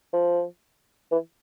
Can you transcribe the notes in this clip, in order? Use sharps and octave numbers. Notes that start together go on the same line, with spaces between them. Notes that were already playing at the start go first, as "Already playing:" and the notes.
F3
E3